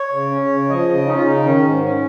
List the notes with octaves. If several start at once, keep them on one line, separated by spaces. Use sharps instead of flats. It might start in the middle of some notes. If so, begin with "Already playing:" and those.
Already playing: C#5
C#3
C#4
C#3
F3 D#5
C#3
C#4 D#4
F4
C#3 D#4
D#3 C#4
G#2
C#4